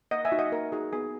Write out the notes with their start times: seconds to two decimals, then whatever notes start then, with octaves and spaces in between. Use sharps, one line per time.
0.11 A#3 D#5 F#5
0.25 E5 G#5
0.32 D#4 F#4
0.39 D#5 F#5
0.52 A#3 A#4
0.72 D#4 F#4 G#4
0.93 B3 G#4